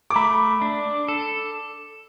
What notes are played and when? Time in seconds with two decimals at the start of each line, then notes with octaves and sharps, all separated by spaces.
0.10 D6
0.16 A3 B5
0.62 D4
1.08 A4